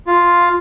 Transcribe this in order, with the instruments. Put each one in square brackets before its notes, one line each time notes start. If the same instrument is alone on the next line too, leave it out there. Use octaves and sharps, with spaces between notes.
[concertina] F4